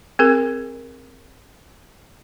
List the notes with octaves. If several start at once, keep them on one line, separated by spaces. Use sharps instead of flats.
C4 G#4 A#4